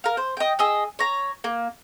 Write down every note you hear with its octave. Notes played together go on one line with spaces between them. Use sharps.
A#4 F5
C5
D#5 G5
G#4 D#5 E6
C#5 A#5
A#3